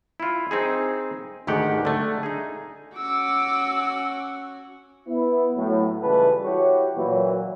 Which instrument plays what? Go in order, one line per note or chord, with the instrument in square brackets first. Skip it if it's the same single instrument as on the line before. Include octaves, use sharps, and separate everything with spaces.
[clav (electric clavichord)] E4 F4
C4 D#4 G#4
D2 G#2 D#3 G4 F#5
D3 A3
D#4 G#4
[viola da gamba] C#4 F#4 [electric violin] D6 E6
[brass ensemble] B3 E4
A2 F#3
C#2 E3 G3 A3 B4 A5
E4 F#4 G4 C#5
A#2 E3 F#3